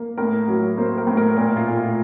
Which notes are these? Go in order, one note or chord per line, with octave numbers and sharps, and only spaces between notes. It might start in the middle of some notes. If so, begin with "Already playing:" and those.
Already playing: A#3
A2 A#4
F#3
A#3 C5
A#4
A2
A#4
A#2 A#4
F4
A#2
F4